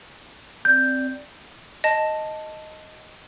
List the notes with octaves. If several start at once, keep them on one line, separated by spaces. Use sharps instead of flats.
C4 D5 G6
D#5 A5